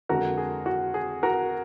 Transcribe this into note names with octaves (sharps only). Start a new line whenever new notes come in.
F2 D3 G#3 F#4 A#4
G#4
F#4
G#4
F#4 A#4